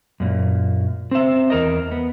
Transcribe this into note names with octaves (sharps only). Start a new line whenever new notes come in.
F#2 A#2
C4 E5
E2 A#4 D#5
B3